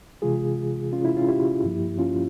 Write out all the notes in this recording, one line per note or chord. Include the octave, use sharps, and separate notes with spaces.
C3 E3 G#3 F4 G#4
C#4 F4
E4
C#4 F4
E4 G4
G2 F3 A#3
C#4 F4